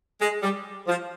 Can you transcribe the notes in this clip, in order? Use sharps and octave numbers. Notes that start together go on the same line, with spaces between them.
G#3
G3
F3